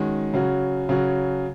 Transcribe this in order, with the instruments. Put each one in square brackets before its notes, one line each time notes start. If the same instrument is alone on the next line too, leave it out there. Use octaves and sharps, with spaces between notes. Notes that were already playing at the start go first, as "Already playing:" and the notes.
Already playing: [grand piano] D#3 G#3 C#4 F#4
C#3 F#3 C#4 F#4
C#3 F#3 C#4 F#4